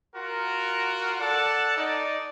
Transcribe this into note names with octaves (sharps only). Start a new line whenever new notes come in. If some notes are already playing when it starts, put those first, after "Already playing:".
F4 F#4 A#4
A4 D5 F#5 A5
D#4 D5